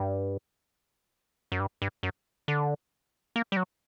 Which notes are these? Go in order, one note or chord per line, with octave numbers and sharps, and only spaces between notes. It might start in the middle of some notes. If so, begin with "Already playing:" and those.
Already playing: G2
F#2
G2
G2
F#2
D3
A#3
G3
F#3